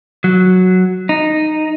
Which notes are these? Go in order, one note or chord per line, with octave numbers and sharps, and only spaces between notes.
F#3
D#4